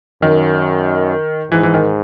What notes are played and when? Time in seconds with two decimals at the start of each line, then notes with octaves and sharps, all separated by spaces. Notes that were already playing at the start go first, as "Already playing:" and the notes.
0.22 F#2 D#3
1.52 G#2 E3
1.63 E3
1.74 D#3